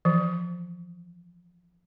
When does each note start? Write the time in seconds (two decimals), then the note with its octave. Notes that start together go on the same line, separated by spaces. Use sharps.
0.05 E3 F3